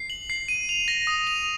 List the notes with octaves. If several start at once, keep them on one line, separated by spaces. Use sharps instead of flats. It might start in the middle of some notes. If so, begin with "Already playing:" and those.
Already playing: C7
F#7
C7
D#7
F7
A#6
D#6
F7